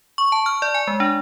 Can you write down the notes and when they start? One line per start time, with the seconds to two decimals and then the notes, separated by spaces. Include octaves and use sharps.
0.18 C#6
0.32 A5
0.46 F6
0.62 D5
0.75 G#5
0.87 G#3
1.00 D4